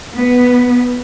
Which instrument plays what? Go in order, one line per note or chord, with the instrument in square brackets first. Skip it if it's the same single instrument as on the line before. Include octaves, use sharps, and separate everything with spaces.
[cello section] B3